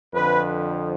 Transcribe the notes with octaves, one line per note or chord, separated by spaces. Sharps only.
F2 D3 F3 B4